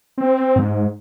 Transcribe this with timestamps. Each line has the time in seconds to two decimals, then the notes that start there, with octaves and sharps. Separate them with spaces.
0.18 C4
0.56 G#2